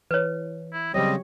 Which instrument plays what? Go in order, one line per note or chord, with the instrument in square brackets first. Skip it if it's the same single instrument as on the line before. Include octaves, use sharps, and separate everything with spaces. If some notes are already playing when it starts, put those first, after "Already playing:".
[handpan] E3 [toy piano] B4 C#5
[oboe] E4
[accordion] C#3 G3 C4 [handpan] F#3 G4 C#5 [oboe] D#5